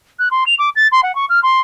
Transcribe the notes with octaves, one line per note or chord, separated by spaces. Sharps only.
F#6
C6
F7
D6
A6
C6
F#5
C#6
F6
C6